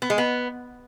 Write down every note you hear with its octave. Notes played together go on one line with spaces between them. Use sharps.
B3
G#3
B3